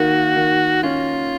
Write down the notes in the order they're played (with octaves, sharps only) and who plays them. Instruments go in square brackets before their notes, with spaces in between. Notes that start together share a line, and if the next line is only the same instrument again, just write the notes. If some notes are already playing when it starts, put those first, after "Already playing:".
Already playing: [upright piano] D#3 A#3 [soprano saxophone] F#4
[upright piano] D#3
[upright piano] C#4 [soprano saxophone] F4